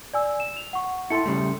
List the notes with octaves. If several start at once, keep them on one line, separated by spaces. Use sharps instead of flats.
D5 G#5 E6
E7
F7
F#5 C#6
E4 A4 C6 C#7
C#3 G3 A3